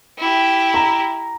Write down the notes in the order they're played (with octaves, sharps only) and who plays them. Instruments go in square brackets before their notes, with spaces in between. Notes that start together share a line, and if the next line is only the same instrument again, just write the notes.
[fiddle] E4 G4
[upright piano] A#5